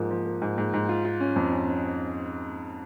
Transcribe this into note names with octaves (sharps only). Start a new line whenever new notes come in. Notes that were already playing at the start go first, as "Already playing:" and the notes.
Already playing: G#2 F3 A#3
F3
A#3
G#2
G#2
G#2
F4
F4
C#4
F2
C#4
C#4